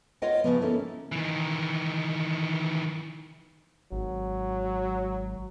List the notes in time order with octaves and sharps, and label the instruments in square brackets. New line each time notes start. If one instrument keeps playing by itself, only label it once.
[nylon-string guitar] F4 C#5 D#5 F#5 G5
C#3 F3 B3
A#3 C#4 E4 A4
[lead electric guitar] D#3 E3
[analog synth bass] G#1 [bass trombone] F#3